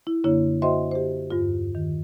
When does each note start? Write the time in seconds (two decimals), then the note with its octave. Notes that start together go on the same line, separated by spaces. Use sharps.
0.07 E4
0.24 F#2 D3 A#3 D4 E4 C#5
0.62 F#4 C5 D#5 E5 G5 C6
0.91 G4 C5
1.31 E2 G2 F4
1.75 D#3